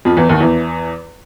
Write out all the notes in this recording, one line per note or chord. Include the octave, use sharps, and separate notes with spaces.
F2 F3
E2 E3
D#2 D#3
E2 E3